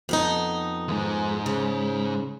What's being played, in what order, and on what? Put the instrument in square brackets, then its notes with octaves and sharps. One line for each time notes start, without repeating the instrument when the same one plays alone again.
[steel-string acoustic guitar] F2 B3 D#4
[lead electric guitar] D#2 G#2
[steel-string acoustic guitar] C#3